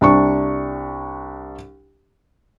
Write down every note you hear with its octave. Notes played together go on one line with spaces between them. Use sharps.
C2 D4 C#6